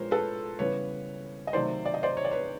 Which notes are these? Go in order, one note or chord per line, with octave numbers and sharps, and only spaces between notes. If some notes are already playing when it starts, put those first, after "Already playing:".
Already playing: A#2 F3 G#3 B3 A#4 C5 C#5
A4 B4
C#3 E3 G3 B3 B4 C#5
D#5
C3 D#3 F#3 A3 C5 D5
D5
D#5
C5 D5
C#5
D5
B4 C#5